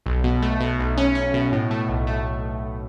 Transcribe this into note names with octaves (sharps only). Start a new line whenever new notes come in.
B1
B2
A3
B2
B1
C#4
C#4
B2
A2
A3
B1
A3